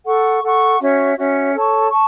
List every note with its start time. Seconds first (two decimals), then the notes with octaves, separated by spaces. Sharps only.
0.06 A4 F#5 C#6
0.43 A4 F#5 C#6
0.80 C#4 F#4 C#5 E5
1.17 C#4 F#4 C#5 E5
1.54 A4 C#5 A5 C#6
1.92 A5 C#6